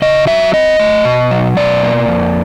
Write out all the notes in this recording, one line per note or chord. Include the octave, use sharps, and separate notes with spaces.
C#3 D#5
F#3 E5
C4 D#5
A3
B2
F#3
B2 D5
A#3
F2